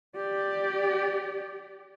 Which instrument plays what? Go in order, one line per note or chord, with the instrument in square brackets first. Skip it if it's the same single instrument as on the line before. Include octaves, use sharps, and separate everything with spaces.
[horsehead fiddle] G4 D5